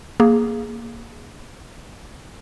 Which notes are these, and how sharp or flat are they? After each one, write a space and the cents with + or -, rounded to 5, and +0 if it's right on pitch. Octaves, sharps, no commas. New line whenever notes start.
A#3 +0 G#4 +0